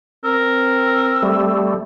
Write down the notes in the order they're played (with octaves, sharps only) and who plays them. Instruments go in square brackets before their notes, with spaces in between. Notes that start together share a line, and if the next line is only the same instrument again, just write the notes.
[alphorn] C4 [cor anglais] A#4 [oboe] E6
[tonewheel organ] G3 A3